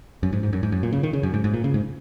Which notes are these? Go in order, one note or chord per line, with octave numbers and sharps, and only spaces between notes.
F#2
G#2
G#2
F#2
G#2
F#2
A#2
C#3
D#3
C#3
F#2
G#2
G#2
A#2
C#3
G#2